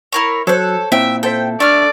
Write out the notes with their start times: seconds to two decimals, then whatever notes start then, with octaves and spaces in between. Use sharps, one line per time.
0.12 E4 A#4 C#5
0.47 F#3 A4 C5 C#5 F#6
0.92 A#2 C4 E4 E5 G5
1.23 A4 C5 E5 G5
1.60 A3 D4 D5 F6